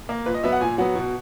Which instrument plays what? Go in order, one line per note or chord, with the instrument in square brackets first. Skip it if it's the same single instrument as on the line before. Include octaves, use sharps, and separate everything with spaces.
[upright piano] A#3
A#2 B4
D#5
F#3 B3 E5
F#5
A#2 G#5
F#3 B3 F#5
B2